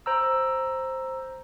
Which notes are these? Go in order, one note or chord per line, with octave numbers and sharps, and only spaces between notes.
C5 A#5 E6